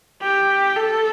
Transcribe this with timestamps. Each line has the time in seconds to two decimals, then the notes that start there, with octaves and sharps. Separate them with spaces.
0.22 G4
0.76 A4